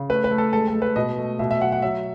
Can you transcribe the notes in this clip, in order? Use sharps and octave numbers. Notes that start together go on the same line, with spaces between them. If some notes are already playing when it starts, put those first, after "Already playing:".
Already playing: C#3
A3 B4
B4
A3
A4
G#3 A4
A4
G#3
B4
B2 D#5
A3
B2 E5
E5
F#3 F#5
F#5
F#3 E5